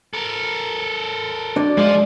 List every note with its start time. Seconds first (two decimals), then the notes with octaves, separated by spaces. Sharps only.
0.14 A4 A#4
1.56 D4 D5
1.78 F3 G#3 F4